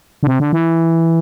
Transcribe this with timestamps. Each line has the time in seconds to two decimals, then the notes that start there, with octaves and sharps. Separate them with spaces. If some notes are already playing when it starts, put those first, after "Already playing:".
0.23 D3
0.27 C3
0.40 D3
0.53 E3